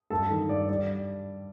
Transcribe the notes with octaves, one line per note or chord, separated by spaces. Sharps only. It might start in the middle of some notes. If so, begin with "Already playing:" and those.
G2 A4 A5
D#3
G2 D5
G3 D5